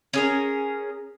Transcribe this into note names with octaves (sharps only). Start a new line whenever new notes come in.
C#4 G#4 A#4